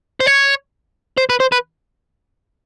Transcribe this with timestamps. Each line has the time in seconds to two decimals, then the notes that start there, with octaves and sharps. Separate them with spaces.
0.20 C5
0.26 C#5
1.18 C5
1.30 B4
1.40 C5
1.52 B4